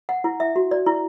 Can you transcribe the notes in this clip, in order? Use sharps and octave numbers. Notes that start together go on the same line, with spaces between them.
F#5
E4
E5
F#4
D5
E4